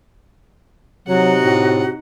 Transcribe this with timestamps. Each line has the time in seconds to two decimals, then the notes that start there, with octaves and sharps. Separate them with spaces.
1.08 C3 F#3 D#4 F#4 F#5
1.42 A2